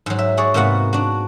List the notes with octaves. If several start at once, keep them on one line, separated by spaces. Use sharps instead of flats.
G#2 F#3
E5
F#4 G#4 C#5 D5
G#2 C3 A#3 B3 F#4 F#5
D4 F#4